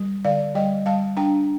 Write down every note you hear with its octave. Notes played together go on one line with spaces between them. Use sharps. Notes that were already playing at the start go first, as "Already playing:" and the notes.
Already playing: G3
D3 D5 F5
G3 D#5 G5
G3 F5 A5
D4 G5 A#5